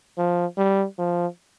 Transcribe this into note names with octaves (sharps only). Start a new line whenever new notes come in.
F3
G3
F3